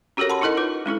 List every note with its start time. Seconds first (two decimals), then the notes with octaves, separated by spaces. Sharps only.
0.17 C#4 F#4 G4 A4 A#4 C#5
0.29 F#5 A5 B5 C6
0.41 D#4 E4 A4 A#4 D#5
0.57 F4 B4
0.86 G#3 C#4 E4 A4